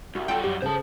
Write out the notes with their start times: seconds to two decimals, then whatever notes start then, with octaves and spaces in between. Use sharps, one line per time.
0.15 C2 F#4
0.28 G3 F4 F#4 A4 G5 G#5
0.44 F#2 G4
0.62 C#3 A4 C5 A5